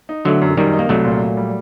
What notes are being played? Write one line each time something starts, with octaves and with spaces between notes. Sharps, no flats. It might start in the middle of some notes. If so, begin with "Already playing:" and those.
D#4
D3 F#3 A3
F#2
F#2 D#3 G3
D#4
A#3
C2 F#3 A3
A#2
A#2
G3